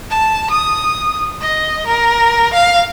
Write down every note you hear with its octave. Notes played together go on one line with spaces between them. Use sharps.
A5
D#6
D#5
A#4
F5